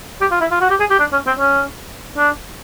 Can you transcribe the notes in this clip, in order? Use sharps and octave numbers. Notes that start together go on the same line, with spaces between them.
G4
F4
E4
F4
F#4
G4
G#4
G4
D4
C#4
C4
C#4
D4